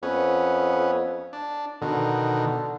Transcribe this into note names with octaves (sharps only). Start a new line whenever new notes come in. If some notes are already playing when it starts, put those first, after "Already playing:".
F2 B3 C#4
D4
B2 D3 D#3